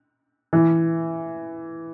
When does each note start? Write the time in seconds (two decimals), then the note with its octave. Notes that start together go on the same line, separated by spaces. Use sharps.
0.53 E3